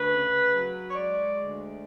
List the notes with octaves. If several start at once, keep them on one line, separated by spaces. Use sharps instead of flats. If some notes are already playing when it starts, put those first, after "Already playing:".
Already playing: D2 B4
C#3
F#3
C#5
G#3 D5
D2